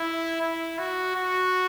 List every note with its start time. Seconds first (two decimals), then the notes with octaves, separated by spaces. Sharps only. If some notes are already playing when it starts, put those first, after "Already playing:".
Already playing: E4
0.41 E4
0.79 F#4
1.15 F#4